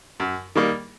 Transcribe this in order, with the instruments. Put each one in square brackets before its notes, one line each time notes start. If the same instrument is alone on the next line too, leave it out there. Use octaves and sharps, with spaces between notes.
[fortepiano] F#2
D#3 G3 A#3